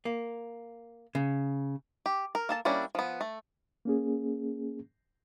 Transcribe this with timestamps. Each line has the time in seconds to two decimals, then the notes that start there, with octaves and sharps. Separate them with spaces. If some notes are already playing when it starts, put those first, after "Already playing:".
0.05 A#3
1.15 C#3
2.06 G4
2.35 A#4
2.49 A#3 A4 A5
2.65 G3 A#3 C#4 D4 E4
2.95 F3 B3
3.21 A3
3.85 A#3 C#4 G#4